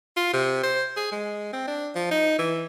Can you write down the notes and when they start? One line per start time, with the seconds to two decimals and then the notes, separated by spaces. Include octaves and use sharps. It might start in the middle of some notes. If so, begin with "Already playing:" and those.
0.17 F4
0.33 C3
0.63 C5
0.96 G#4
1.12 G#3
1.53 C4
1.67 D4
1.95 F3
2.11 D#4
2.39 E3